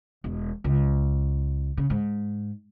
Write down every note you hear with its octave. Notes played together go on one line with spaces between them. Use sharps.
E1
C#2
C#3
G#2